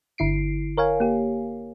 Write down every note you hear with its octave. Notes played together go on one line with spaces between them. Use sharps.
G1 D3 E4 C7 D7
A#4 C#5 F5 G#5
A#3 G4